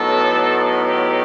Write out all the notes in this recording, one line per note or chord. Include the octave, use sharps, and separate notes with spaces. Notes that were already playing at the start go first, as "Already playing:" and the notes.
Already playing: A2 F#3 B3 D#4 A4
G4